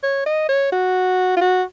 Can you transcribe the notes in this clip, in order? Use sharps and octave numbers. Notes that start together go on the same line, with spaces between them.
C#5
D#5
C#5
F#4
F4
F#4